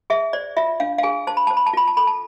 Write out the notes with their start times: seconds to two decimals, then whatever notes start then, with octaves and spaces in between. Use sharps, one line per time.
0.10 G#4 E5
0.33 C5 D5
0.57 F4 E5
0.80 D4 F5
0.98 F5
1.03 G#4 G#5
1.27 C5 A5
1.37 B5
1.47 C5 A5
1.57 B5
1.67 A5
1.73 F4 B5
1.87 A5
1.97 A4 B5
2.07 A5